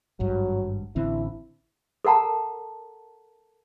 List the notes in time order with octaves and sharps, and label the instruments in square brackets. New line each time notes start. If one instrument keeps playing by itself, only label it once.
[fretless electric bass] G#1 G2 [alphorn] F#3
[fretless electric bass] A1 D3 C4 [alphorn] E4
[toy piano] A4 A#4 F#5 A5 A#5